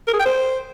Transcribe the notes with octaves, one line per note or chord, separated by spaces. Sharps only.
A#4
G#4
G5
C5